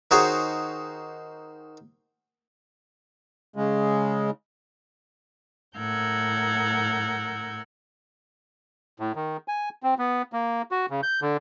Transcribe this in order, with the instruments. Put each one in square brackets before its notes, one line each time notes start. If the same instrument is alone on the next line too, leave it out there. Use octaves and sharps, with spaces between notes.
[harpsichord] D#3 D#4 F#4 G#4 C5 C#5
[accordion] C#3 G#3
[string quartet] A2 A#4 F#5 E6 G6 G#6
[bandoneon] A2
D#3
G#5
C4
B3
A#3
F#4
C#3
G6
D3